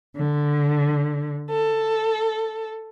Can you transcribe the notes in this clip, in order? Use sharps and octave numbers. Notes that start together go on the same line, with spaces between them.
D3
A4